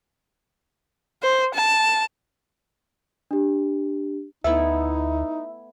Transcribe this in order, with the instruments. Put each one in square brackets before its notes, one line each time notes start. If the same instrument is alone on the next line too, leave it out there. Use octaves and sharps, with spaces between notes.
[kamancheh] C5
A5
[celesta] D4 G4
[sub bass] D2 [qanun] A3 B3 E4 [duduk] D#4 [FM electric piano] E5